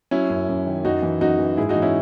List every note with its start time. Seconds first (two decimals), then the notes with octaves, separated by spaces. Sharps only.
0.11 F#3 C#4 E4
0.30 F#2
0.49 F#2
0.66 D#3
0.85 F#2 D#4 F#4
1.03 E3
1.21 F#2 D#4 F#4
1.39 E3
1.57 G#2 E4 G#4
1.69 D#4 F#4
1.76 E3
1.82 C#4 E4